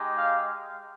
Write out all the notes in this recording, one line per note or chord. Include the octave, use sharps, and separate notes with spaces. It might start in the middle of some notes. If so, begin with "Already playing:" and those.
Already playing: G#3 D#4 G4
F5